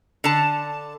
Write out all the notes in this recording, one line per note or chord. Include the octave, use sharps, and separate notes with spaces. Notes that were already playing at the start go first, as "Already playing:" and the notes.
D3 A5